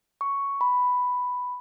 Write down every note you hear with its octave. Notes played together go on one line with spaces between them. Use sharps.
C#6
B5